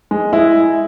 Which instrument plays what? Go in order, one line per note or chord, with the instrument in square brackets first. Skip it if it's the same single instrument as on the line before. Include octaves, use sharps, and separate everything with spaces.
[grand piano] G#3
G#3 E4